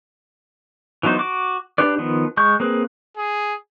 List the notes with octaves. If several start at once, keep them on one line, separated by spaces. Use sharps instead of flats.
E3 F#3 B3 D#4 C5
F#4 D6
D4 G4 B4 D5
D#3 F3 B3
G#3 C#6 G6
A#3 C4 G#4 B4
G#4